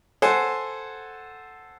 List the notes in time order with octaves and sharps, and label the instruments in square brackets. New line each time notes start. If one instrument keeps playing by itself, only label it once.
[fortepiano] A4 C5 F#5 G#5